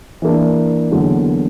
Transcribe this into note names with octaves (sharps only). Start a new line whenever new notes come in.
E3 A#3 D4
E2 D3 F#3 A#3